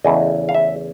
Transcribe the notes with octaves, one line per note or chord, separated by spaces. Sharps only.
E2 C#3 E3 A3 D#5
F5
E5